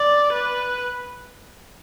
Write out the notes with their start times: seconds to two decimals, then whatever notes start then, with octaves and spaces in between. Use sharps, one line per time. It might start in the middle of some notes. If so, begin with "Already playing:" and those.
Already playing: D5
0.33 B4